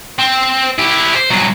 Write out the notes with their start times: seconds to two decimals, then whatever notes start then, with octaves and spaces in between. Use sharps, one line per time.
0.19 C4
0.78 E4 G4
1.15 C5
1.30 C2 F#3